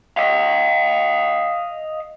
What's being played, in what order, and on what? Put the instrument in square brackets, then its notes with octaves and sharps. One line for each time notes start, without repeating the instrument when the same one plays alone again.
[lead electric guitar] D#5 F5